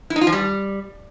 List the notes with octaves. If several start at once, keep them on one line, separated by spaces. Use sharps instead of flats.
E4
D#4
F4
F3
G3